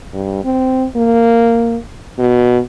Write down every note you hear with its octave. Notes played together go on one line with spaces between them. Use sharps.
G2
C4
A#3
B2